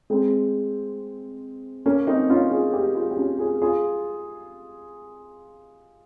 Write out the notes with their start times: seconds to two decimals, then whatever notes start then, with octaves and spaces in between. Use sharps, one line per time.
0.10 G#3 C4
1.86 A#3 C#4
2.07 C4 D#4
2.30 C#4 F4
2.51 F4 G#4
2.73 G4 A#4
2.95 F4 G#4
3.11 G4
3.17 C#4 F4
3.39 F4 G#4
3.62 F4 G#4